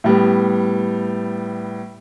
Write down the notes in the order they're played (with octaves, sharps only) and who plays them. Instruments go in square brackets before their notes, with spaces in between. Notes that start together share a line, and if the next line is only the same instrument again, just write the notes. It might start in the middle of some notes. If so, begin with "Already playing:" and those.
[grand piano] A2 G3 B3